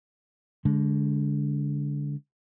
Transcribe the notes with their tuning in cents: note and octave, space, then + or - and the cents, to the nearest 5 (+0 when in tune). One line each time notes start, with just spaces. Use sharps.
D3 -25 G#3 +0